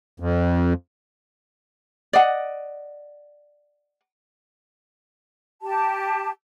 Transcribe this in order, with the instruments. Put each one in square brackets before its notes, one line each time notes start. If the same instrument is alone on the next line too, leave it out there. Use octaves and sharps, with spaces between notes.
[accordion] F2
[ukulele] D5 D#5 F#5
[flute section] G4 A5